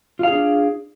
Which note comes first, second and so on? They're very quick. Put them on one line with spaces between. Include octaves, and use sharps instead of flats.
F4 F5 G#4 D4